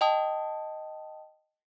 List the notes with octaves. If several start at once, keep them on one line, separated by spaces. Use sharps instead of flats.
D#5 G5 A5 D#6